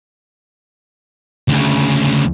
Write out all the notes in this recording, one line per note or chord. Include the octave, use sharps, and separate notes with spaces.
D2 C#3